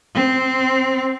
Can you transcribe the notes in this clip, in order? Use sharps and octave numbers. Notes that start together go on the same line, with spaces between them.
C4